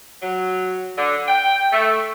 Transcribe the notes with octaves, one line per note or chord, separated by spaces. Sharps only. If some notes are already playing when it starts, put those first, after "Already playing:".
F#3
D3
G5
A3